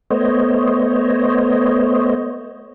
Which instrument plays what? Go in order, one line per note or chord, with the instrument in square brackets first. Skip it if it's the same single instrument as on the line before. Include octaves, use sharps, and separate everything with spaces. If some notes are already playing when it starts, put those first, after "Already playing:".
[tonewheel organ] A3 B3 C5 C#5 D#5